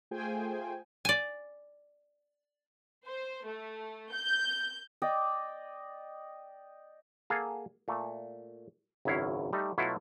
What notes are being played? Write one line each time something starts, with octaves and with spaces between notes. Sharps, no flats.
A3 F4 G#4 C5 G5 G#5
D5 G#5
C5
A3
G6
D5 D#5 G5
A#3 G#4 A4 F5 F#5
A#2 A3
G#1 C#2 F#2 E4 C#5 F5
G3 A3 D#4
B2 F#3 A3 E4 F4 A4